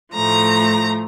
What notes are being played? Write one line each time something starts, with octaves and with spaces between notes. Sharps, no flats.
A2 F3 A3 A#5